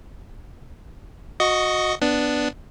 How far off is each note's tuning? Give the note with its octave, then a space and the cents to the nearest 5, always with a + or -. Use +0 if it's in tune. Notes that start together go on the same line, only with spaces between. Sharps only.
F#4 -20 D#5 +0 C#6 +15
B3 +0 D4 +0